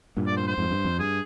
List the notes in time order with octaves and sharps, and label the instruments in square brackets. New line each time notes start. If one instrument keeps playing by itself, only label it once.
[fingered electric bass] G2 A#2
[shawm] D5
C5
C5
[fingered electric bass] F2 G#2
G2
F2
[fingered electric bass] G2 [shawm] G#4